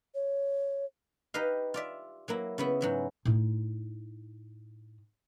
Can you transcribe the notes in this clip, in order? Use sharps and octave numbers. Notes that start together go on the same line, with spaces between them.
C#5
D#4 G4 B4 D#5 F5
F4 D5 E5
F#3 A#3 E4
C#3 B3 E4
G#2 F#3 E5
A2 D#4